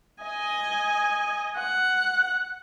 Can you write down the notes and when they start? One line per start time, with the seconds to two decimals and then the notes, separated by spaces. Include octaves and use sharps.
0.23 D#5 G#5
1.56 F#5